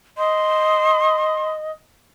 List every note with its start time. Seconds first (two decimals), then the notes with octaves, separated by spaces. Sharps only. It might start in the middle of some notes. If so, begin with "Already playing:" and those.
0.18 D#5 C6